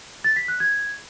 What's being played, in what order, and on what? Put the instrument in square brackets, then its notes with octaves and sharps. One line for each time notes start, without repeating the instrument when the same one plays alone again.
[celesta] A6
B6
F#6
G#6